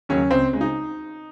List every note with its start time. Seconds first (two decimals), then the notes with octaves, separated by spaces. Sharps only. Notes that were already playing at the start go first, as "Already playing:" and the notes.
0.09 D#2 C#3 F#3 C#4
0.31 C#2 C4
0.53 C#3 G#3
0.61 D#4